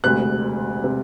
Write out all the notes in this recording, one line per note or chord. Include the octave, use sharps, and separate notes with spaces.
E1 D2 C3 F#6
C3